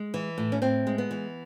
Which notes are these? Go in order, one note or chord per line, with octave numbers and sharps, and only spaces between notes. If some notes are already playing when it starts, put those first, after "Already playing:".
Already playing: G#3
E3
A2
C#4
A2 C4
G#3
B3
E3